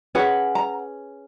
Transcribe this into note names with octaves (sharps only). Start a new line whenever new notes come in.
C#4 G#4 B4 F#5
A#5